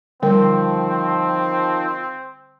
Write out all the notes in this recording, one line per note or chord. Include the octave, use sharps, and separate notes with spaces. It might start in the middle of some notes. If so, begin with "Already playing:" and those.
D3 D#3 F3 G3 C4 A#4